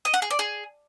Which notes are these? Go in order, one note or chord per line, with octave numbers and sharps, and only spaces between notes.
D#5
F#5
G#4
D5
G#4